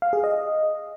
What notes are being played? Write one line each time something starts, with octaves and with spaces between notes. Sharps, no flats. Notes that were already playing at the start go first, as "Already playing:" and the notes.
F5
G#4
D#5